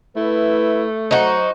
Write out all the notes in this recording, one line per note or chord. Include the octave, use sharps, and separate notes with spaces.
A3 E4 B4
F#3 D#4 F#4 C5